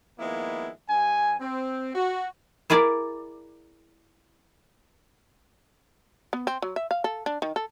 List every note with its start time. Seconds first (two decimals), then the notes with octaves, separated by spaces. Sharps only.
0.18 D#3 F3 G#3 A#3 B3 E4
0.89 G2 G#5
1.40 C4
1.94 F#4
2.70 E4 G#4 A#4 D5
6.33 B3
6.47 C4
6.62 F#3
6.76 E5
6.91 F5
7.04 A4
7.26 D4
7.42 D#3
7.56 A4